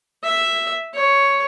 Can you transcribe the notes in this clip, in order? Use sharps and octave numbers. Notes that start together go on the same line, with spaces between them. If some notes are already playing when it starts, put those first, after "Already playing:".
E5
C#5